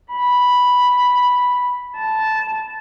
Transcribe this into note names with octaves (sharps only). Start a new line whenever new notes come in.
B5
A5